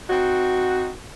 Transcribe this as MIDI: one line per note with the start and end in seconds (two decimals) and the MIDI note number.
0.09 0.90 60
0.09 0.90 63
0.09 0.90 66